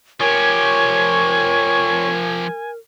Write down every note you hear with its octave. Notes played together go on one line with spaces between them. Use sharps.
F3 G4 A#4 C#5 G#5